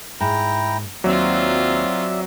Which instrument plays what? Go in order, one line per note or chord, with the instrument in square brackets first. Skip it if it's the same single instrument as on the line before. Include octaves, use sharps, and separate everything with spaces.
[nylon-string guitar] G#2 [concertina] E4 G5 A#5
[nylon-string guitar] D#2 [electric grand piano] F#3 [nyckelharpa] C4 F4 [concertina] D5 E5